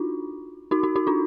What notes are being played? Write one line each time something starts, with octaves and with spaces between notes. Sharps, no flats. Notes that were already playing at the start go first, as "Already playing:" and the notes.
Already playing: D4 D#4 F4 F#4
D#4 F#4
D#4 F#4
D#4 F#4
D4 F4